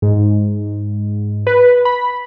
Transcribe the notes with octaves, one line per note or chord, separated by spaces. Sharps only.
G#2
B4
B5